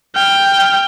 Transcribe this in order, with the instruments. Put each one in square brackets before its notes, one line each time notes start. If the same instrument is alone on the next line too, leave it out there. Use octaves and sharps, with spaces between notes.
[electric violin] G5 F6